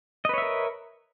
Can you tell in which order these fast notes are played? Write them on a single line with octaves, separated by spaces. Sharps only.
D#5 B4 C#5 E5 A#4